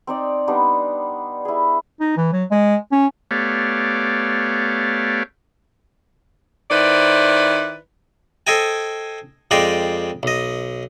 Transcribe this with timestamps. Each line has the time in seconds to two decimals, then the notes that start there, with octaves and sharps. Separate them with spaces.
0.07 C4 D#4 D5
0.48 G3 B3 D4 D#4
1.45 E4 G#4
2.00 D#4
2.17 E3
2.32 F#3
2.51 G#3
2.92 C#4
3.31 A3 B3 G4 C#5 D5 F5
6.71 D#3 E4 B4 C5 D5
8.47 A4 C5 D#5 G5 G#5
9.51 F2 G#3 D5 D#5 G5 C6
10.23 B1 D#5